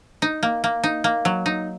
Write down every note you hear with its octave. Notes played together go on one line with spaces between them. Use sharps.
D#4
A#3
A#3
D#4
A#3
F#3
D#4